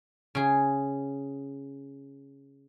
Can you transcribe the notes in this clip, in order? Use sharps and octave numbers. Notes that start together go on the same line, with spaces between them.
C#3 G#4